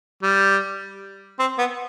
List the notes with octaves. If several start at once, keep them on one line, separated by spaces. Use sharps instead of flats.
G3
C4
B3